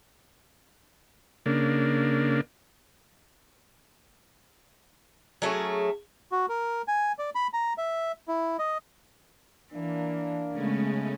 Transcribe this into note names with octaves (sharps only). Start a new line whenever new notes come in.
C#3 A#3 D4
F#3 A3 C#4 G#4
F#4
A#4
G#5
D5
B5
A#5
E5
E4
D#5
E3 A#3 D4
C#3 G#3 A3 B3 C#4